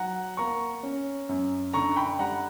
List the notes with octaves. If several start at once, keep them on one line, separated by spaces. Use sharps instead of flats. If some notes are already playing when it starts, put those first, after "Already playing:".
Already playing: F#3 F#5 A#5
A#3 A#5 C#6
C#4
F#2
D3 A#5 C#6
G5 B5
G3 F#5 A#5